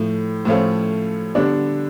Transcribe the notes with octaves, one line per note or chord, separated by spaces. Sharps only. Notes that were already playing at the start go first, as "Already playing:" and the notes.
Already playing: A2 F3
A2 F3 A3 C#4 F4
D3 G3 B3 D4